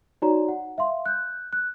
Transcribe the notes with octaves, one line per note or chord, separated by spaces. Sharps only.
D#4 F#4 C#5 D5 A#5
F#5
E5 F5 C6
F#6 G6
F#6